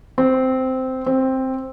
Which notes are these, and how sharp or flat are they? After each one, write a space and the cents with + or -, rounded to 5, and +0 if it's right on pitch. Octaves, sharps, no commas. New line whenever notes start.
C4 -10
C4 +5